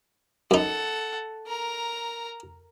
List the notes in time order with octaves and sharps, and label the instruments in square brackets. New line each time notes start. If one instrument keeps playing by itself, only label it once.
[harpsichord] F#2 D#4 [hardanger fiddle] A4 F#5
[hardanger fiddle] A#4 A#5